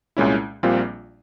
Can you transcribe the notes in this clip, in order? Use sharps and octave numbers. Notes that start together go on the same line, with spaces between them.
C2 A#2 G#3 C#4 E4
A#1 A#2 G3 C4 F4